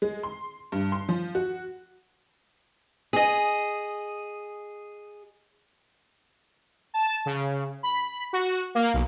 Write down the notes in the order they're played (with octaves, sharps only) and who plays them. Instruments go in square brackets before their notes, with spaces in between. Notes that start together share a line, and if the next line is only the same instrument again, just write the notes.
[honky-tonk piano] G#3
C6
G2
C6
F3
F#4
[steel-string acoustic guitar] G#4 D#5
[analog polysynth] A5
C#3
B5
F#4
A#3
B1